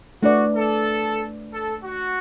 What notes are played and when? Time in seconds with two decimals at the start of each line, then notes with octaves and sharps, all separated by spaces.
0.22 A3 D4 F#4 B4 D5
0.54 A4
1.52 A4
1.84 F#4